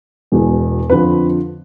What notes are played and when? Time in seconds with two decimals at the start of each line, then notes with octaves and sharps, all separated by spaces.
0.32 E1 E2 B2 G#3
0.90 F2 D3 F3 B4